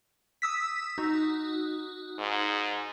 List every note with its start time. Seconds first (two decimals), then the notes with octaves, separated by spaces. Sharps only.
0.42 D#6 E6 B6
0.98 D#4 F#4
2.19 G#2